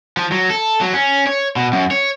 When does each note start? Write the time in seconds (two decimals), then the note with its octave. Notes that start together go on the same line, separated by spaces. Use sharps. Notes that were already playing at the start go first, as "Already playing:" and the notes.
0.17 F3
0.32 F#3
0.50 A4
0.81 F#3
0.94 C#4
1.27 C#5
1.56 B2
1.73 F#2
1.91 C#5